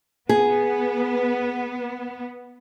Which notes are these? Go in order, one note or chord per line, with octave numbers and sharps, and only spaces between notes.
B3 G#4